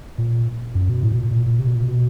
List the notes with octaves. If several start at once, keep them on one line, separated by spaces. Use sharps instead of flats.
A#2
F#2
B2
A2
B2
A#2
A#2
A#2
C3
B2
A#2
B2